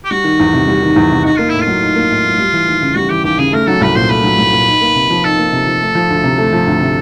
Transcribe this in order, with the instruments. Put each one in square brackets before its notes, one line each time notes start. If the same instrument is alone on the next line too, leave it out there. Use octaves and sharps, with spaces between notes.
[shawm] G4
[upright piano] G3 [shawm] F#4
[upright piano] D#3
E2
C3
G3
D#3
E2
C3
[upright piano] D#4 [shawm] F#4
[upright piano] A#3 [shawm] F4
[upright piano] A2 [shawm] E4
[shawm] F4
[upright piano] F#3
D#4
A#3
A2
F#3
G3
E3
D#2
C#3
[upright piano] G3 [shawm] F#4
[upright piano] E3 [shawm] G4
[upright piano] D#2 [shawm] G4
[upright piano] C#3 [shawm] G#4
[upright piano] A3 [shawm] A#4
[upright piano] F#3 [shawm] A4
[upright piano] C2 [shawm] B4
[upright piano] A#2 [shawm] C5
[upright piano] A3 [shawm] B4
[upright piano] F#3
C2
A#2
D#4
A#3
C3
F3
[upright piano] D#4 [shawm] A4
[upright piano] A#3
C3
F3
A3
F3
D2
C3
A3
F3
D2
C3